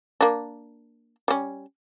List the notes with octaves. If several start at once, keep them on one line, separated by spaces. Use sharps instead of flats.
A#3 D4
G3 C#4